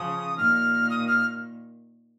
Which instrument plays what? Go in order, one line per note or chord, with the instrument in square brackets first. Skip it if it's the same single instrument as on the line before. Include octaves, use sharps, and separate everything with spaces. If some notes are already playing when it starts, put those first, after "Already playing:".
Already playing: [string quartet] C#3 F3 [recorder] D#6
[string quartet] A#2 D#3 [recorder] F6
[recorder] D#6
F6